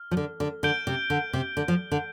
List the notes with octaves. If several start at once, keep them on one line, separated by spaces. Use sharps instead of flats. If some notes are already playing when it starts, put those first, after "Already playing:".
Already playing: F6
F3
D3
D3
D3 G6 D7 G7
C3
D3
C3
D3
F3
D3